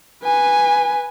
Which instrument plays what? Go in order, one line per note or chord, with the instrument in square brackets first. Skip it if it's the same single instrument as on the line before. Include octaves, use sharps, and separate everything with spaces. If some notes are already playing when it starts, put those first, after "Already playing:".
[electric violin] B4 G#5